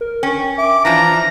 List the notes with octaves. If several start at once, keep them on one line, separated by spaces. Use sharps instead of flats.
A#4
C#4 G5
E5 D6
E3 F3 D4 A#5